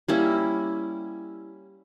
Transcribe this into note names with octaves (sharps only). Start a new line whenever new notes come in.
G3 A#3 C#4 E4